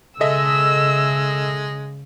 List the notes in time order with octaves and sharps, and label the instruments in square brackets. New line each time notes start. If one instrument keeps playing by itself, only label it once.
[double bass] C#3 [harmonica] G#3 [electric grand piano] A4 D#5 E5 [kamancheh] E6